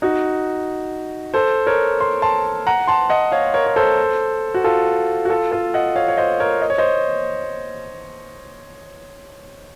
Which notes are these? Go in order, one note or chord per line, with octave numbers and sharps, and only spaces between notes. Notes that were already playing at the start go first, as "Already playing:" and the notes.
D#4 F#4
A4 C5
A#4 C#5
C6
A5 C6
F#5 A#5
A5 C6
D#5 F#5
C#5 F5
A#4 C#5
C#5
A4 C5
F#4
F4 A4
F#4
F4 A4
F4 A4
D#5 F#5
C#5 F5
C#5
C5 D#5
A#4 C#5
D#5
C#5
C5 D#5